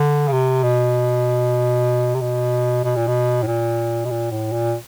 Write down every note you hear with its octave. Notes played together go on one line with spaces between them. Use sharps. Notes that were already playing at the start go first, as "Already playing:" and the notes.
Already playing: D3
C#3
C3
B2
C3
B2
B2
A#2
B2
A2
A#2
B2
A#2
A2
A#2